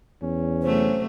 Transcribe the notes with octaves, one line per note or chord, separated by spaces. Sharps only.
E2 C#4
C3 F#3 A3 C5